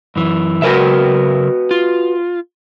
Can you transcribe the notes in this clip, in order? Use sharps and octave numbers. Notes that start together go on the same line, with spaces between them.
F#2 E3
C#3 F#3 F#4 A#4 B4 E5
F4